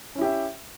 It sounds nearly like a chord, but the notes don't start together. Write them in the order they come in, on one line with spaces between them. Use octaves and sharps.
C#4 E4 G4 E5